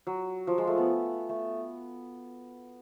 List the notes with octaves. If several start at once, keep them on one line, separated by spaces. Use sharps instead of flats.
F#3
F3
G#3
A3
B3
A3